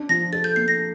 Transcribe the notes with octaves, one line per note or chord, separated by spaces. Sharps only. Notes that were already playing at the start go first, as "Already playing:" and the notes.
Already playing: D4
F3 A#6
A4 A6
G6
A#3 C7
A#6